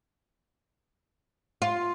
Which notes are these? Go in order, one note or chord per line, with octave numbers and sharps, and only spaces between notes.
F4